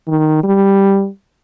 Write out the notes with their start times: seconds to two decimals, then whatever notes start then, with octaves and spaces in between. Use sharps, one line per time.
0.08 D#3
0.43 G3